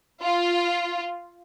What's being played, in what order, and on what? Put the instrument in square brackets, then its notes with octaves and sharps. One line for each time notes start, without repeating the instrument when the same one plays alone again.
[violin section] F4